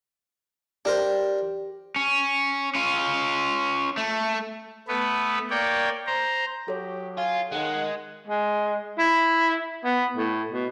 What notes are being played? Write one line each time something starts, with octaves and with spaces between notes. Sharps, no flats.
D4 G4 A#4 C5
C#4
C#4 F4
A3
A3 B3 B4
A#3 C#5 D5 G5
C5 A#5
F#3 G4 A4 C#5
F4 G#5
D#3 G#3 F#5
G#3
E4
B3
A2
B2